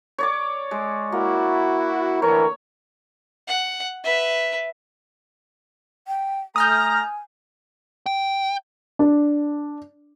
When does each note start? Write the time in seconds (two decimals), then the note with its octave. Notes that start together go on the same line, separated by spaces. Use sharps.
0.18 C#5 D5 D6
0.71 G#3
1.12 A#3 E4 F#4
2.22 A2 D3 E3 A#4 C#5
3.47 F#5
4.04 B4 E5
6.08 G5
6.56 A3 G#5 A#5 D#6 F6 G6
8.06 G5
8.99 D4